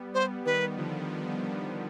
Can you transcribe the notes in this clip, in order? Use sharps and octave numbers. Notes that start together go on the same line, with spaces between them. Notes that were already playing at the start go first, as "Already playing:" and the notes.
Already playing: G3 B3
G3 B3 C5
D#3 G3 B4
D3 F3